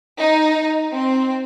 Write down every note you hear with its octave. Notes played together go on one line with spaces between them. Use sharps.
D#4
C4